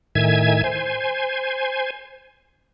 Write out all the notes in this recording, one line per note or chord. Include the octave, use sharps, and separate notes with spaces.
A2 D#3 E5 G#5 G#6
C5 G#5